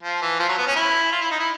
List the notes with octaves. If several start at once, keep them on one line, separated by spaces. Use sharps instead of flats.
F3
E3
F3
F#3
B3
C#4
E4
F4
E4
D#4
E4